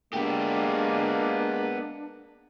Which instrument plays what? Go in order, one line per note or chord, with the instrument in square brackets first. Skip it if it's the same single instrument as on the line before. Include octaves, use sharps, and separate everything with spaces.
[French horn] G#3 [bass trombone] A#3 [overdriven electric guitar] B3 G4 [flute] D4